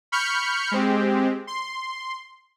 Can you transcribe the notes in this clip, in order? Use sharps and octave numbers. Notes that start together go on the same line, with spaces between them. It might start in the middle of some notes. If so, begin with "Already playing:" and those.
B5 C#6 F6 G6 C#7
G#3 C4 G4
C6